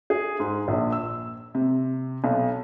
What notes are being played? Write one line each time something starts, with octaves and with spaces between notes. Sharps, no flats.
G#4
G#2
A#1
E6
C3
B1